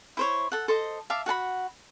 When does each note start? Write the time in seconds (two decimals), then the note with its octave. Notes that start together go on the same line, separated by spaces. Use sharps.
0.17 E4 C5 C#5
0.52 A4 F#5
0.68 A4 C5 D#5
1.10 E5 F5 A5 D6
1.26 F#4 F#5 A5 B5